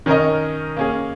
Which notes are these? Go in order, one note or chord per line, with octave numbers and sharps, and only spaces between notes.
D#3 C#4 A#4 D#5
A#3 C#4 G#4